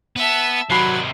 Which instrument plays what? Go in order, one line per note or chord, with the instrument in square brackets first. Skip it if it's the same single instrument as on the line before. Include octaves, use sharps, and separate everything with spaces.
[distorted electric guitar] B3 [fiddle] E5 A5
[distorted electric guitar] C3 D#3 [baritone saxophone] F#3 [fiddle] D5 [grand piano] B5 C7